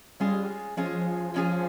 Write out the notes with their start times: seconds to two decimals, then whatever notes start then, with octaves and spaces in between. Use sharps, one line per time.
0.20 G3 G#3 C#4 F4 G#4
0.77 F3 G#3 C#4 F4 G#4
1.34 G#3 C#4 F4 G#4